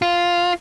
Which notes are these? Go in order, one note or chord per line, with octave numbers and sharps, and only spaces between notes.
F4